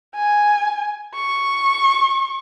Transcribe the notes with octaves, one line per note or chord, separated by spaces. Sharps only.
G#5
C#6